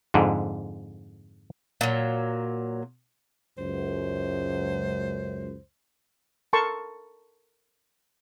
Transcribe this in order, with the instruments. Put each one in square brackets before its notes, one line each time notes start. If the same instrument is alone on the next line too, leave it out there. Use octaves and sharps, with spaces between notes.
[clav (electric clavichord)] F2 G#2 D3
[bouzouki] A#2 F#3
[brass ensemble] C#2 F#2 [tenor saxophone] C5
[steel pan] A4 A#4 A5 C6 C#6